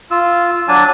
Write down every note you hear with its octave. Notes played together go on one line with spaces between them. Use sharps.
F4 E6
F#3 D4 G#5 A5